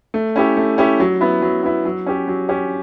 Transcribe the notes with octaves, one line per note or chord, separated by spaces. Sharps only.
A3
C#4 E4 G4
A3
C#4 E4 G4
F#3
B3 E4
F#3
B3 E4
F#3
C#4 G4
F#3
C#4 G4